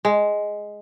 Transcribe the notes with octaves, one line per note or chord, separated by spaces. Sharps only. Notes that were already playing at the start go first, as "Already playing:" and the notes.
G#3